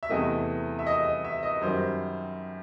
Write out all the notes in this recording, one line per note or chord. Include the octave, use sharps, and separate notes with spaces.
E5
E2 C3 E3 A3 D#5
E5
D#5
D#5
E5
D#5
F#2 D#3 G3 C5